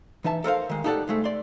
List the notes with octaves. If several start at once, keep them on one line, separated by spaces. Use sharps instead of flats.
E3 D#4 E5 A5
A4 A#4 C5 F5
D#3 G#3
D#4 G4 A4 A#4 D5 F#5
C2 G#3 A3
D5 C6